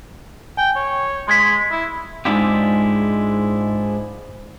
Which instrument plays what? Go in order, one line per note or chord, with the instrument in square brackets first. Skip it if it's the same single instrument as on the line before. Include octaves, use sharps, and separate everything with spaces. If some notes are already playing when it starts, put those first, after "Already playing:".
[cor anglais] G5 [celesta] G#5
[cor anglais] C#5
[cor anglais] G#3 [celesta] C6 G#6 B6
[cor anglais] E4
[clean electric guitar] G#2 G#3 D4 E4 F4 G4